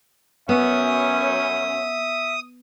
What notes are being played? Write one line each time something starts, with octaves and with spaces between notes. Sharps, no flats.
F#2 B3 C#4 E5 D#6